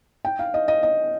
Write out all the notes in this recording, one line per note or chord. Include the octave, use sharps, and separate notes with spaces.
G5
F5
D#5
D#5
D#5